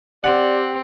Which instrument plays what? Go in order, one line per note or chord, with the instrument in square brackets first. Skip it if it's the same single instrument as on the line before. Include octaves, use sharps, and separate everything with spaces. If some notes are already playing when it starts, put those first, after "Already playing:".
[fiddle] C4 [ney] G4 [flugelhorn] D5 [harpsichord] F#5